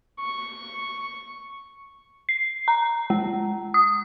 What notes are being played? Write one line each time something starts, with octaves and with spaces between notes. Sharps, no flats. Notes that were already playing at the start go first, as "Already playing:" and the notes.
C#6
C7
A#5
G#3
D#6